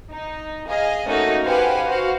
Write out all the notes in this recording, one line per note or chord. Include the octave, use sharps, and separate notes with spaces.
D#4
G#4 D#5 F5
A3 A#3 C#4 D#4 F#4 A4
G4 B4 C5 F5 F#5 G#5
F#4 C5 F5